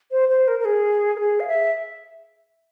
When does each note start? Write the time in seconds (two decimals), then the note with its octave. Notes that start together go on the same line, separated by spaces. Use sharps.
0.11 C5
0.29 C5
0.48 A#4
0.59 A#4
0.65 G#4
1.16 A#4
1.20 G#4
1.40 F5
1.47 E5